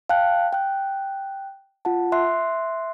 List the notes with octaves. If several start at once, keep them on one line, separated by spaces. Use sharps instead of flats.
F5 G5 A5 F#6
G5 F#6
F4 F#5 A5
E5 C6 F#6 C7